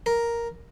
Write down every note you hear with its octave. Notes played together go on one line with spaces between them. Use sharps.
A#4